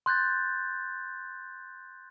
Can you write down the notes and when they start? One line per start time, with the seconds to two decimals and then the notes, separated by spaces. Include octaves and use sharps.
0.06 C6 F#6 G6 A6